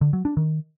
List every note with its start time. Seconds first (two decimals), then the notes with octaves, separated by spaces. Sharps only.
0.01 D3
0.13 F#3
0.25 D4
0.37 D#3